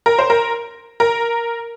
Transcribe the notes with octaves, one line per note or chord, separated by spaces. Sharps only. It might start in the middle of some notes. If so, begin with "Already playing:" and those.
A#4
C5
A#4
A#4